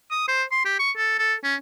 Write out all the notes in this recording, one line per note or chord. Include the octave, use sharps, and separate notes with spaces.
D#6
C5
C6
G4
C#6
A4
A4
C#4